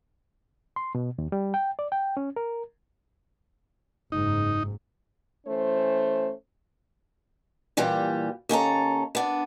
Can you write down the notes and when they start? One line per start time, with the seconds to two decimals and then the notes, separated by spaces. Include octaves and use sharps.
0.76 C6
0.95 B2
1.18 D#2
1.32 G3
1.54 G5
1.79 D5
1.92 G5
2.17 C#4
2.36 A#4
4.12 F#1 G#2 D#4
5.47 E3 A3 C#4 C5
7.77 A#2 E3 G3 G4
8.49 D#2 C#4 A4 A#5
9.15 B3 D4